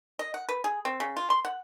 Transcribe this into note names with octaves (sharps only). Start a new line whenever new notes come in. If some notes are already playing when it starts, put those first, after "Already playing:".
D#5
F#5
B4
G#4
C4
C#3
F4
C6
F#5